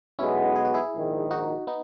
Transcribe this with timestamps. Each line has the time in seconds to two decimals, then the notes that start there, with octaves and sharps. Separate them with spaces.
0.19 B1 B2 G#3 B3 C#4 E4
0.56 G#4
0.65 F#4
0.74 E4 G#4
0.93 A#1 G#2 D#3
1.31 D#4 F#4
1.67 B3 D#4